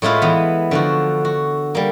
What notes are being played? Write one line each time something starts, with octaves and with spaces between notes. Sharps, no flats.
A2 G#3 E4 F4 B4
E3 B3
D3 F3 F#4
F#4
G3 A#3